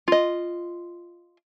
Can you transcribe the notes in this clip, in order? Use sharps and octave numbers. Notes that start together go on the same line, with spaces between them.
F4 D#5